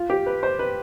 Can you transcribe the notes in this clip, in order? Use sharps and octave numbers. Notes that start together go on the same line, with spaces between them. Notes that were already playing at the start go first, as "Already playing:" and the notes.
Already playing: F4
G4
B4
C5
B4